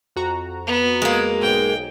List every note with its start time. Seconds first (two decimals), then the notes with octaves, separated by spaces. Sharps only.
0.16 F2 F#4 A#5
0.67 B3
1.02 G#3 A#3
1.42 B1 G#2 G5